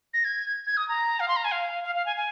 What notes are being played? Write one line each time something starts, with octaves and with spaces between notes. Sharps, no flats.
A#6
G#6
G#6
D#6
A#5
F5
C6
A#5
G#5
F5
F5
F5
G#5
G#5